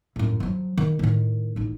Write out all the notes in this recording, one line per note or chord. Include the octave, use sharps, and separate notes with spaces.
F#2 A2
F3 F#3
D#3
A2 D#3
A1 D#4